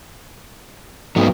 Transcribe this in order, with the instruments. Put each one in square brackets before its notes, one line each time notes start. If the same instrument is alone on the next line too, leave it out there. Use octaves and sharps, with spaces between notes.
[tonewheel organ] G#2 A3 D#4 [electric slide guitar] F#3 B3 C4